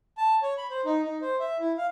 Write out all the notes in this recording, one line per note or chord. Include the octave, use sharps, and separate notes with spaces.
A5
C#5
B5
C5
D#4
D#4
C5
E5
E4
F5